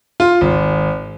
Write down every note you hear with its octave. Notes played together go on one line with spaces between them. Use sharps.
F4
G#1